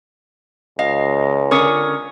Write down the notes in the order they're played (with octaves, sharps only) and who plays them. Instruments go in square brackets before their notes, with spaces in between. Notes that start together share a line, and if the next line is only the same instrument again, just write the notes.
[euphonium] C#2 [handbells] D#5 [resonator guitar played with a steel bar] F5
[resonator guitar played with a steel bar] D3 C#4 [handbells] A#4 C#6 D#6